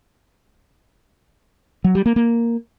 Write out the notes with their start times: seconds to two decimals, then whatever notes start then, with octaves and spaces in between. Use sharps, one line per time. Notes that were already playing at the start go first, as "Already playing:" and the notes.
1.84 F#3
1.95 G3
2.06 A#3
2.16 A#3